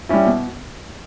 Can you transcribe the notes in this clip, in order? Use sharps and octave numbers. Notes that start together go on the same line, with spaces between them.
G3 C#4 E4
B2